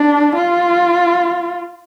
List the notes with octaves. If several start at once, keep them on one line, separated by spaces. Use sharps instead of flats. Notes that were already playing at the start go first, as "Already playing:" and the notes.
Already playing: D4
F4